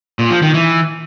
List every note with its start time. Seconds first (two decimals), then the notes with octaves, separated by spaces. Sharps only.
0.19 A#2
0.31 F3
0.42 D#3
0.54 E3